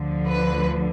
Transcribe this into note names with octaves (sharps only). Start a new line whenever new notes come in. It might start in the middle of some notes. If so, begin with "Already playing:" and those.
Already playing: D2 D3 F3
B4